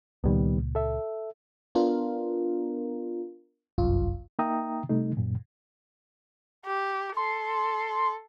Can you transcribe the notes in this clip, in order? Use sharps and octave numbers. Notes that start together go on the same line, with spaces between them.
C#2 A#2 D#3 G3 B3
A4 E5
B3 D4 F4 A#4
G1 C2 F#2 F4
A#3 D#4 E5 G5 A#5 D#6
C3 G3 A3 D#4
F#2 A#2
G4
A4 C6